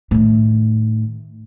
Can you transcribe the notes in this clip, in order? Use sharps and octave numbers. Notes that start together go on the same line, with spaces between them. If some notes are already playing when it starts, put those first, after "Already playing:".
A2 D#3